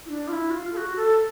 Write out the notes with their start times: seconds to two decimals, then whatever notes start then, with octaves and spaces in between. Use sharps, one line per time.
0.06 E4
0.09 D4
0.28 F4
0.32 E4
0.50 F#4
0.54 F4
0.73 A4
0.77 F#4
0.96 A4